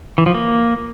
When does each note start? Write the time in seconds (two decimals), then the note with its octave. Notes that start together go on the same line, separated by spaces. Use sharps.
0.18 E3
0.26 F3
0.35 A#3